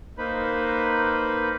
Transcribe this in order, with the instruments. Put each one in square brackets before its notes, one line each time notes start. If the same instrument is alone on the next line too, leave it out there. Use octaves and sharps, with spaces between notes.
[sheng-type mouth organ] A#3 D#4 B4 C5 B5